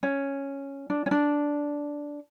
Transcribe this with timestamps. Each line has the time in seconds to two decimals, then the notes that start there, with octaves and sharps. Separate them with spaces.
0.03 C#4
0.90 D4
1.06 C#4
1.11 D4